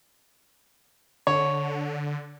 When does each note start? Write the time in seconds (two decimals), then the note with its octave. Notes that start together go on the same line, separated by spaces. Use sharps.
1.27 D3 C#5